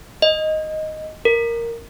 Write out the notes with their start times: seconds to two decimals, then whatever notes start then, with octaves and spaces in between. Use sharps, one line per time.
0.22 D#5
1.25 A#4